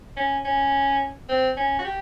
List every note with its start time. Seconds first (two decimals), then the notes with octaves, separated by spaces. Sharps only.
0.17 C#4
0.45 C#4
1.29 C4
1.57 C#4
1.79 F#4
1.85 G4